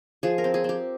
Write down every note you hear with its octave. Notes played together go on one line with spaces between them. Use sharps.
F3 G#4
A#4
C4
G#4
C4 G4